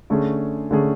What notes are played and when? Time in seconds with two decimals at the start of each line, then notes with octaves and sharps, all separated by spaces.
0.10 D3 A3 C#4 G#4
0.71 D3 A3 C#4 G#4